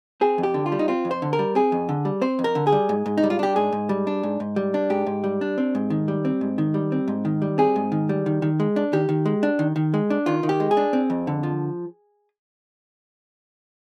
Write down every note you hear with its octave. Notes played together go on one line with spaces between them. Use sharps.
C4 G#4
F2
G4
D3
F4
G3
D#4
C4 F4
F2
C5
D3
A#4
G3
C4 G#4
F2
D3
G3
C4 C5
F2
A#4
D3
G#4
G3
G#2
G#2
D#4
G3
F4
D4 G4
G#2 G#4
G#2
G3
D4
G#2
G#2
G3
D4
G#2 G4
G#2
G3
D4
C4
G#2
D#3
G3
C4
G#2
D#3
G3
C4
G#2
D#3
G3
C4 G#4
G#2
D#3
G3
D#3
D#3
G#3
D4
D#3 G4
D#3
G#3
D4
D#3
D#3
G#3
D4
D#3 F4
D#3
G4
G#3
G#4
D4
C4
F2
D3
F3